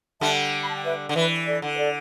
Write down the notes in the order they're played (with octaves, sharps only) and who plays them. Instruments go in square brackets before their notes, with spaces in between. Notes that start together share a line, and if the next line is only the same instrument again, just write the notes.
[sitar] D3 G3 [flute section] E5 A5
[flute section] B5
A5
G5
B4 E5
[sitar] D3
[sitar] E3 [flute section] B4 E5
[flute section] A4 D5
[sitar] D3
[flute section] B4
A4 D5